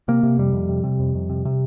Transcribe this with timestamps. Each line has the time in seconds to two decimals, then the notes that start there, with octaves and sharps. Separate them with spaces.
0.08 C3 A#3
0.23 C3
0.38 F2 G3
0.53 F2
0.69 C3
0.84 C3
1.00 F2
1.14 F2
1.30 C3
1.45 C3